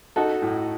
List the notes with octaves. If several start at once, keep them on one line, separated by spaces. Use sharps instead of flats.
D#4 F#4 A4
A2